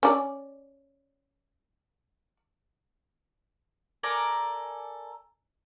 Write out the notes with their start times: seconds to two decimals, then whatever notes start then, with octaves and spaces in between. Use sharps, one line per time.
0.03 C#4 D5
4.03 A4 A#4 D5 G#5